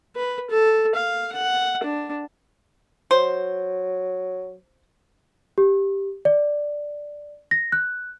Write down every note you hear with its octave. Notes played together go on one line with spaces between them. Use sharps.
B4
A4
F5
F#5
D4
F#3 C5
G4
D5
A#6
F#6